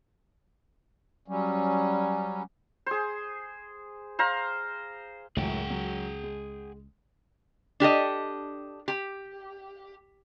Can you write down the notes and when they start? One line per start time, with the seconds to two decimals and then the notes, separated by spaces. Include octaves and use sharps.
1.28 F#3 G3 C#4
2.86 G#4 C5
4.19 C5 F5 A#5
5.37 C#2 F#2 A2 G#4 F#5 G5
5.70 F#3
6.23 G#3
7.80 D4 G4 A4 D#5
8.88 G4